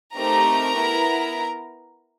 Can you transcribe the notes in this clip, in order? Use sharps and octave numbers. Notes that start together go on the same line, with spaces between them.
A3 C4 D#4 G4 A#4 A#5
B3 E4